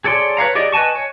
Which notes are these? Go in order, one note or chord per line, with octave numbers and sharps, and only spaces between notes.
G#4 A4 C#5 D5 C6
B4 C#5 F5 A#5
G4 G#4 D5 D#5
B4 D#5 G#5 A5 C#6
C#5